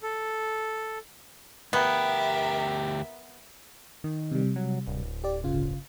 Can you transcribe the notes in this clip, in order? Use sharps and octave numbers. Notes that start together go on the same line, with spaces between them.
A4
D2 B3 G4 A#4 E5
D#3
C3 G3
F#3
D1
G4 D5
G1 C#3 F4